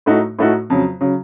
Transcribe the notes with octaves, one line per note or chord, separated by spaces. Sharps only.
A2 A3 D#4 F#4
A2 A3 D#4 F#4
F2 C#3 F#3
C#3 F#3